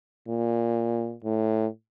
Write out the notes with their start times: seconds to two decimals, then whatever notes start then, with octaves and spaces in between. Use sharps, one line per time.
0.28 A#2
1.24 A2